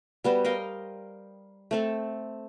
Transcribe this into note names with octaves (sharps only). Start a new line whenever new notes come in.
G3 B3 F#4 C5
A#4 D#5 F5 G5
A3 C4 A4